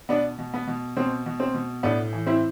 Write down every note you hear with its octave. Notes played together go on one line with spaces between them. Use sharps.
B2 B3 D4
B2
B3
B2
B2 C4
B2
C4
B2
A2 B3 D4
E3
C4 E4